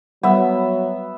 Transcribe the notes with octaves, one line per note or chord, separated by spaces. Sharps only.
F#3 G3 B3 E5 F#5